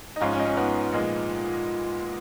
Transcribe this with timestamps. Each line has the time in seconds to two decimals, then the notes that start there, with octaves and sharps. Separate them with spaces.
0.16 D#4
0.20 G#2 F3 G#3 C#4 F4
0.33 C#4
0.40 D#4
0.46 C#4
0.57 B3 D#4
0.93 A#2 F3 G#3